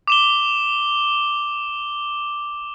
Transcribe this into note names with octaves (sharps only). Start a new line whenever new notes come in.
D6 E7 G7